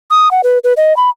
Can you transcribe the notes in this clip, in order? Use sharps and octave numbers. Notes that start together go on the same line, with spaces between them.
D#6
F#5
B4
B4
D#5
B5